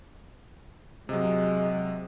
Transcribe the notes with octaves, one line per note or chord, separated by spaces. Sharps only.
C3 F#3 G#3